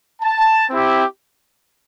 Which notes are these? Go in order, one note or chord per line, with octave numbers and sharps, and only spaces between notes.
A5
C4 E4 G4